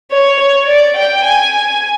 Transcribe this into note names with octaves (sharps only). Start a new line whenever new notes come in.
C#5
C#5
D5
G5
G#5